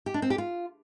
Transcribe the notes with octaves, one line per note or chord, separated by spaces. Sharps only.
G4
D4
C4
G4
F4